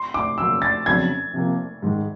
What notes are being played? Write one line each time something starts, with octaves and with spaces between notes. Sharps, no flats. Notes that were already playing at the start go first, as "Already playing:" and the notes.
Already playing: C6
D6
F#2 C#3 F#3 A#3 E6
A6
F2 C#3 F#3 B3 D4 G#6
C3 F3 A#3
G#2 D#3 G#3